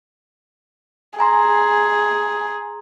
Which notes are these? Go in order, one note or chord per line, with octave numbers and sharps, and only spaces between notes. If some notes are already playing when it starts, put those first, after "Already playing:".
G#4 G#5 A#5 C6